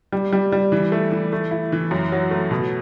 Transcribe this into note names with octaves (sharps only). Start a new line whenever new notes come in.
G3
G3
G3
E3
A3
E3
A3
E4
E3
F#2
F#3
A3
B2